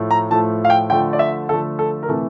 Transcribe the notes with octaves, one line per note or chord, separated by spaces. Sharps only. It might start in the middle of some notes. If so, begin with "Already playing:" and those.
Already playing: A2 F3 A3
A#5
A2 F3 A3 A5
F5
G5
D3 F3 A3 G5
D5
E5
D3 F3 A3 A4
A4
A#4
C3 E3 A3 A4